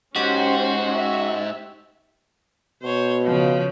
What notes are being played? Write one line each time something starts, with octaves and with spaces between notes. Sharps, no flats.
G#2 C#4 F#4 G4 C5
E5
B2 C5 C#5
C#3 F3